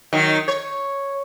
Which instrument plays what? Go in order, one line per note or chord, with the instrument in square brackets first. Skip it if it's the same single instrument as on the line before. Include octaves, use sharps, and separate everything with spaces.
[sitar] D#3 F#3
C#5